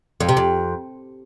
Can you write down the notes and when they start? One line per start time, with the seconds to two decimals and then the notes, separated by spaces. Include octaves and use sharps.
0.21 F2
0.29 C3
0.37 F2